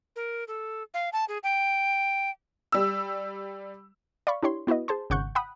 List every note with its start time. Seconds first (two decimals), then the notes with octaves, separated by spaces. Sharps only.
0.16 A#4
0.48 A4
0.94 F5
1.13 A5
1.28 G#4
1.43 G5
2.72 G3 E6
4.27 D5 F5 B5 C#6
4.43 D4 E4 G4 C#5 C6
4.67 B3 E4 F#4 B4 D#5
4.88 G#4 C5 A5 C6
5.10 G#1 C#3 F#5 C#6 F#6 G6
5.35 F#5 G5 B5 D#6 F#6